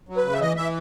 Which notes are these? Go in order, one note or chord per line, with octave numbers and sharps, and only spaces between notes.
F#3
B4
C#3
E5
E3 D#5
E3 E5